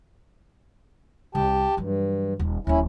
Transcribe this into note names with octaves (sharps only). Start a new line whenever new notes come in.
C2 G4 G5 A5
G2 E3 F#3
D#1
D1 F3 C#4 E4